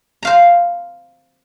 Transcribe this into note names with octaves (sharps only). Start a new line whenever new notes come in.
C5 F5 A#5